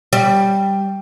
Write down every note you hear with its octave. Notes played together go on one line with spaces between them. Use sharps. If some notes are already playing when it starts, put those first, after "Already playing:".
G3